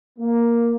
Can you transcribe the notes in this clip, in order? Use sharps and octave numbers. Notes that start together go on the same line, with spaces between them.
A#3